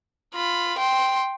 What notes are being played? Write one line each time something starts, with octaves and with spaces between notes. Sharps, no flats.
F4 B5
G5 C6